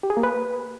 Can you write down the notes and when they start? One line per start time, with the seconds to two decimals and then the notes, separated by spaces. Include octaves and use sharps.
0.03 G4
0.10 G#4
0.17 A#3
0.23 B4